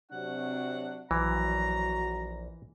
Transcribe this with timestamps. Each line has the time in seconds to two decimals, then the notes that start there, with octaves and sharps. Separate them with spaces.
0.11 C3 F#3 D4 F#5
1.11 A#1 E3 F#3 F#4 A#5